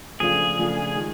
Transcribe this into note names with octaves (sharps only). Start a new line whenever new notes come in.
C#3 F3 A3 D4 F4 G#4
C#3 F3 A3 D4 F4
D#3 G#3